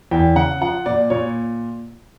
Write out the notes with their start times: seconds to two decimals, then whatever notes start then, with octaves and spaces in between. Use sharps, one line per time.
0.11 E2 G5
0.36 C#3 F#5
0.61 F3 F#5
0.86 A#2 D5
1.10 A#2 C#5